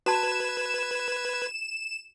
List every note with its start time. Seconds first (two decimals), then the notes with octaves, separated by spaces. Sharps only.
0.06 F#4 B4 A5 G#6 E7